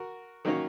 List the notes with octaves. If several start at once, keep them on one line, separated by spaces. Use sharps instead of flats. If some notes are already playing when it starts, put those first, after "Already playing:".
Already playing: F#4 A#4
D#3 F#3 A#3 C#4